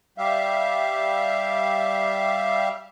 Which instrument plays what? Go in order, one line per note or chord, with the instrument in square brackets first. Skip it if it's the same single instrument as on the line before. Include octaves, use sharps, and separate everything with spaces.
[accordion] G3 G4 E5 F5